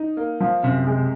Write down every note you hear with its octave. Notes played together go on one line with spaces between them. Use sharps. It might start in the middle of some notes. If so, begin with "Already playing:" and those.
Already playing: D#4
A#3
F3
F#2 C3
G#3